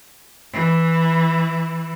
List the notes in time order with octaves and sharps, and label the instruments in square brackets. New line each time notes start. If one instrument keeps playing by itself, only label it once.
[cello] E3